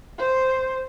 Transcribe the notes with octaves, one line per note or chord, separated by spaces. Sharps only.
C5